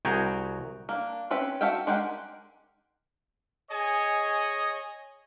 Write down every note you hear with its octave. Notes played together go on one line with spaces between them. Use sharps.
C2 F#4 G#4 G5 G#5 A#5
A#3 D4
C4 C#4 B4 E5
F#4 A4 E5 F5 G5
G#3 D#4 G4 A#4 F#5
G#4 C#5 D#5 G#5